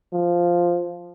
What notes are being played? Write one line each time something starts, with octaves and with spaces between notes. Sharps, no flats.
F3